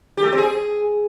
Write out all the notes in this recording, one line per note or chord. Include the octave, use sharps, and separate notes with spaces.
G4
A3
G4
C4
G#4